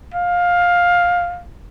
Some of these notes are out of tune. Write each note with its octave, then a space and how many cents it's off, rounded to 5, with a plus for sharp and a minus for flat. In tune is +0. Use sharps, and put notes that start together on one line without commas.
F5 +15